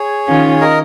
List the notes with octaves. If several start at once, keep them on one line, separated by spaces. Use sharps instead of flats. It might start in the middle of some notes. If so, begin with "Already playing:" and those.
Already playing: G#4 C#5
D#3 C#4 F4
A#4 D#5